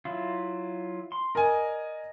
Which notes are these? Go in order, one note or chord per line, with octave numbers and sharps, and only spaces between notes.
F#3 E4 F4
C6
A#4 D5 D#5 G#5